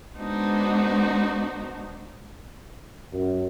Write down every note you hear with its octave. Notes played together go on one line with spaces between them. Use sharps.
G#3 B3 D4 D#4 F#4 C5
F#2